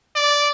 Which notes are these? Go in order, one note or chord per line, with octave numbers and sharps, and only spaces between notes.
D5